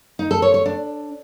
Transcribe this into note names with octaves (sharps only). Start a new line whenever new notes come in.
D#4
A4
C#5
C#5
D4